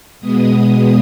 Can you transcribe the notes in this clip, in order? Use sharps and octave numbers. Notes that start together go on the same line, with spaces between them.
B2 G#3 B3 D#6